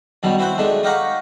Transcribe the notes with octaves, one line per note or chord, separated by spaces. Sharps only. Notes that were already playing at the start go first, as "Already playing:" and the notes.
F#2 B2 D#3 F#3 G3
C4 E4 F#4 C5 F#5
D#3 G#3 A3 D4
D#4 G4 F5 F#5 A#5 C#6